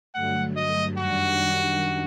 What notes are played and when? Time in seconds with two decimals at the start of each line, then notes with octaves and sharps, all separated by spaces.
0.14 G2 D3 F#3 A3 F#5
0.56 D#5
0.97 F#2 D#3 G3 D4 F#4